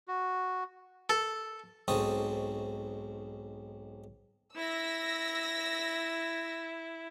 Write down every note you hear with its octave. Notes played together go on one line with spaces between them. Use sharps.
F#4
A4
B1 G#2 C4 A4 C#6 D#6
E4 E6 A#6